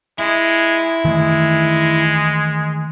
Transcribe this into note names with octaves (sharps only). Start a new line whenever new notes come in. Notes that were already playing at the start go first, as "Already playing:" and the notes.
G#3 E4
D#3 E3 G#3 A3